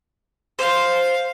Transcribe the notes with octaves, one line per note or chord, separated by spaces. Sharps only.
C5 F5